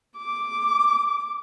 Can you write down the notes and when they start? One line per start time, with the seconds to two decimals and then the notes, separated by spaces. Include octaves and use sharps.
0.18 D6